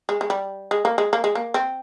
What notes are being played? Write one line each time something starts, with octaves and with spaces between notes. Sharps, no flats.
G#3
G#3
G3
G#3
A#3
G#3
A#3
G#3
A#3
C4